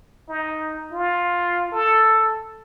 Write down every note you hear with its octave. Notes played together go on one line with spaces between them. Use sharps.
D#4
F4
A4